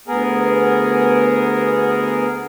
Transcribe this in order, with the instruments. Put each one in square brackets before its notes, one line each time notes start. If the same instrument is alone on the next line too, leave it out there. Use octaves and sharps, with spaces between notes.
[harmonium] D2 B3 G#4 A#4